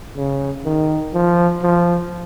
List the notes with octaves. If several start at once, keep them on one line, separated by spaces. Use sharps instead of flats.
C#3
D#3
F3
F3